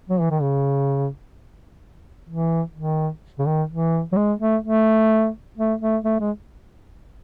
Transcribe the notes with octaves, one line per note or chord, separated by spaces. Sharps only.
F#3
E3
D#3
C#3
E3
D#3
C#3
D#3
E3
F#3
G#3
A3
A3
A3
A3
A3
G#3